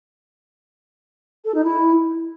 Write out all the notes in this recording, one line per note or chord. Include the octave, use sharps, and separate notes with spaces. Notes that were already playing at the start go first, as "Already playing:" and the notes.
A4
D#4
E4